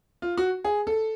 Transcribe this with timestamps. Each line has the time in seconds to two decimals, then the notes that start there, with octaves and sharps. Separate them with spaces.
0.22 F4
0.37 F#4
0.64 G#4
0.87 A4